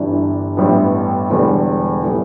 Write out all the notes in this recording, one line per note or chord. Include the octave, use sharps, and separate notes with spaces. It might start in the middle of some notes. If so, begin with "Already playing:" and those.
Already playing: G1 G2 E3 G3 D4
A1 G2 G3 B3 E4
E1 E2 D3 G3
A2 G3 B3